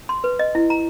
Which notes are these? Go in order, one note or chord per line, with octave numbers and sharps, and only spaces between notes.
C6
B4
D#5
E4
A#5